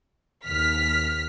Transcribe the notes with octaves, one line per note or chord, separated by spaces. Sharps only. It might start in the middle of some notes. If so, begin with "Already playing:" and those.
D#2 F6 B6